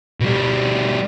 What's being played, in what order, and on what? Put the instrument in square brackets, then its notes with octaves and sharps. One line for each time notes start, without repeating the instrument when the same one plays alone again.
[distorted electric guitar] B2 G3